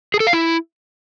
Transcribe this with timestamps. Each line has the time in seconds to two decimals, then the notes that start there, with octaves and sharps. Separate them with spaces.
0.14 G#4
0.20 A4
0.27 F5
0.33 E4